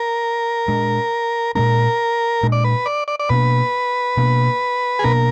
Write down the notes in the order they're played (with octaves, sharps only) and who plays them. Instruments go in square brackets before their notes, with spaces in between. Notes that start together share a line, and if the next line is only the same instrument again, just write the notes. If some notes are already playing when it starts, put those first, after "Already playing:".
Already playing: [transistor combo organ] A#4
[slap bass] A#2 G#3 D4
[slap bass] A#2 G#3 D4 [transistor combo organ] A#4
[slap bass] A#2 G#3 D4
[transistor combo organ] D5
B4
D5
D5
D5
[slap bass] B2 A#3 D4 [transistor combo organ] B4
[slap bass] B2 A#3 D4
[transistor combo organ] G#4
[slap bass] B2 A#3 D4 [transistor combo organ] A#4